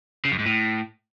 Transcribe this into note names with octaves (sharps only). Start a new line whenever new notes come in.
C#3
F#2
G#2
A2